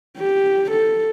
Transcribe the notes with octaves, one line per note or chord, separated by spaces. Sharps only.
G4
A4